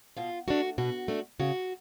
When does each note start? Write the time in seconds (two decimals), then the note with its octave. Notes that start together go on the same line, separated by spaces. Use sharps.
0.17 B2 F4
0.48 A3 D4 F#4
0.78 B2 F#4
1.08 A3 D4
1.40 C#3 F#4